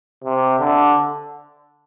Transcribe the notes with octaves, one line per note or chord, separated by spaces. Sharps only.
C3
D3